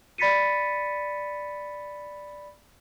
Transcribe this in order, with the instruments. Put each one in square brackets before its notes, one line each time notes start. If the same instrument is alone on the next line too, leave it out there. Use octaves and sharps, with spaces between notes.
[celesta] D5 B5 A6 B6 C#7 D#7